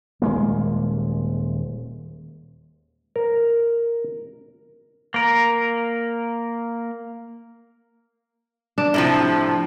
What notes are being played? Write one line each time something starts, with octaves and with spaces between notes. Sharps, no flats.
D#1 G#3 A#3
A#4
A#3 A#4
D4
A2 C3 F3